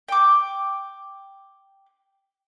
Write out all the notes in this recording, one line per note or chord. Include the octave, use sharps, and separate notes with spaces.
G5 D6